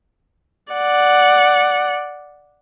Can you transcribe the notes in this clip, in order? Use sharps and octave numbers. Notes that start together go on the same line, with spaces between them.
D5 F#5